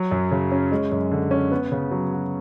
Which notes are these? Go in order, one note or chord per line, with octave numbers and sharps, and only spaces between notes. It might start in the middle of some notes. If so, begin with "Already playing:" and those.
Already playing: F#3
F#2
C#3
C#4
G#3
F#2
D3
C#4
B3
C#3
F#3
F#4